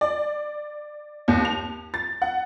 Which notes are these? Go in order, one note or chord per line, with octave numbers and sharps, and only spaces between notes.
D5
D#2
F7
A6
F#5